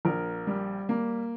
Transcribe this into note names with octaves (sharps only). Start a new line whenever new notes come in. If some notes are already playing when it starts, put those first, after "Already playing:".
A#1 A#4
G3
A#3